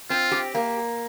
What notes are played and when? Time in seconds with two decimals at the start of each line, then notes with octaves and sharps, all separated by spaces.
0.10 C4 F4
0.31 G4
0.55 A#3